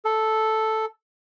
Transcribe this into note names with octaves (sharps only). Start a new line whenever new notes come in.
A4